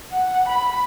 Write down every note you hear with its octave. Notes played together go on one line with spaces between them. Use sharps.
F#5
B5